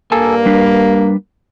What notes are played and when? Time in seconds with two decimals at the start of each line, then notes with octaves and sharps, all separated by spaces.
0.12 G2 A#3 A4 G#5 A5
0.46 G3 D4 B4